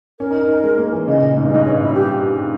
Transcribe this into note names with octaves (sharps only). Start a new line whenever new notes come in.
C#4 A#4
D#4
D#4
D#4
G#3
A#3
E3
C#3 D#5
A#2
G#2
G2
G#2 D#5
C#5
E4
G4